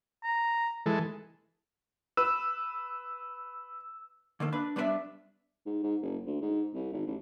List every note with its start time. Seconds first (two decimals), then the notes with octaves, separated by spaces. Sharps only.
0.24 A#5
0.86 E3 G#3 A4
2.17 B4 E6
4.40 D3 D#3 A#3 A4
4.52 D4 B4
4.76 G3 B3 D4 B4 D5 E5
5.66 G#2
5.83 G#2
6.02 F#1
6.26 D2
6.41 G#2
6.74 C2
6.92 G#1
7.07 A1